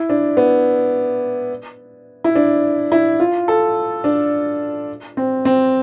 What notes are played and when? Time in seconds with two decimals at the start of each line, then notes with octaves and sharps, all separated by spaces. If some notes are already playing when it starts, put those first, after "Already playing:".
Already playing: E4
0.10 D4
0.37 B3
2.24 E4
2.36 D4
2.92 E4
3.20 F4
3.48 A4
4.04 D4
5.17 C4
5.45 C4